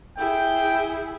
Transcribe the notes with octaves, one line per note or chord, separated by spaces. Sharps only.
E4 G#4 G5